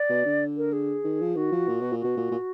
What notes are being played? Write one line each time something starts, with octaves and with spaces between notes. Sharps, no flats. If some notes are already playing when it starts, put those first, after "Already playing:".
Already playing: D5
B2
D3
A#4
G#4
D#3
F3
D#3 F#4
F3
A#2
B2
A#2
B2 F#4
A#2
A#2